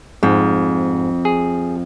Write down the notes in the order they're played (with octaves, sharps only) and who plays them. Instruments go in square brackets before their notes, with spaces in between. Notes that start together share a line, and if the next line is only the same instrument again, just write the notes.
[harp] F2 [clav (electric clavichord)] G#2
[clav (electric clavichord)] G#4